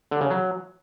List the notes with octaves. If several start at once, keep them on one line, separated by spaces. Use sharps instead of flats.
D3
C#3
F#3